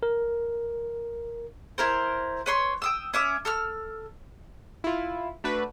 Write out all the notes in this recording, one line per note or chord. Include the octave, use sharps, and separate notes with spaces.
A#4
E4 A#4 C5
B4 C#5 C6
G5 D#6 E6
C#4 E5 D6
A4 E6 F6
E4 F4
A3 D4 F#4 B4